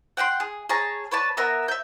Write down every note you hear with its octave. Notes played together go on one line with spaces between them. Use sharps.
F#5 G5 A#5 C6
G#4
G#4 C#5 A5 A#5
B4 C#5 D5 A5
B3 A#4 E5 A#5
E5 G6